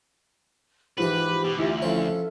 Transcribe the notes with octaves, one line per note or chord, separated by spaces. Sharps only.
G#2 E3 F3 G4 B4
B2
D2 E3 E4 F4
F3 C#4 A4